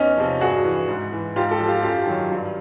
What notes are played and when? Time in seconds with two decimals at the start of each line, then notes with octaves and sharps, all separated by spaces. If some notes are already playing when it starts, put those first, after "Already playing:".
Already playing: E2 C#4 D#4
0.17 C3 F3
0.41 G2 F#4 G#4
0.65 E3
0.88 G#2
1.12 E3
1.36 G#2 F4 G4
1.51 G4 A4
1.60 F3
1.67 F4 G4
1.83 F#2 F4 G4
2.07 D#3 F#3
2.32 G2